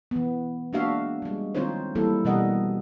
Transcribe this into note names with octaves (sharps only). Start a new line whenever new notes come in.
E3 B3
G#3 A#3 D4 F#4 E5 F5
G3 G#3
D#3 C4 D#4 F4 C5 C#5
E3 G3 A#3 E4 A4
B2 E3 G3 A#4 D#5 F#5